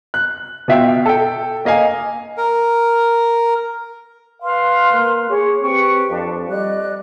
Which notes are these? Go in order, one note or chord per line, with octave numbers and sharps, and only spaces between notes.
F#6
B2 F4 E5 F5 G5
A4 G5
A#3 D#5 F5 G#5
A#4
B4 F5 C6
A#3
G#4 C#5 D6
C4 G4 B4 G5 C#6
F2 D4
G3 D5 D#5 F#6